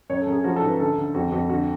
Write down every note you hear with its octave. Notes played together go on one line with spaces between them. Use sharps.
F#2 C#5
A4
F#2
G#4
F3 F#4
A4
G#2
B4
D2 A4
D2
F2 F#4
F2 F#4
D2 F#4